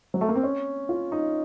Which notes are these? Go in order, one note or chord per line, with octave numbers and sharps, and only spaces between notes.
F#3
A3
A#3
C4
C#4
F4
D#4